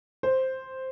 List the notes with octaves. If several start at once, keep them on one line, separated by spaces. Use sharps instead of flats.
C5